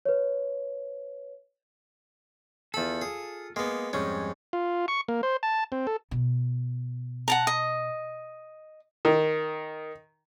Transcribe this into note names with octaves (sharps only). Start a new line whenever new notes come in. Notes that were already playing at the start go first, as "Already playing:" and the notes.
B4 C#5
E2 F4 A4 B5
G#4
G#3 A#3 B3
F2 G#2 G3 G#3 C#4
F4
C#6
A#3
C5
A5
C4
A4
B2
F#5 A5 A#5
D#5
D#3